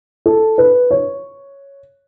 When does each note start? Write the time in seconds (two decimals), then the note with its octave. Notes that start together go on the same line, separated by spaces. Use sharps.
0.26 A4
0.58 B4
0.91 C#5